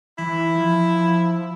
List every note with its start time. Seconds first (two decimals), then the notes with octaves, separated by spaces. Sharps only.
0.19 E3 E4
0.55 F3